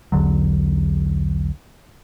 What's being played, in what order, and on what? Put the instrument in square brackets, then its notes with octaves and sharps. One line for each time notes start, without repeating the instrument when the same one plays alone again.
[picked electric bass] B1 E2 D3 F#3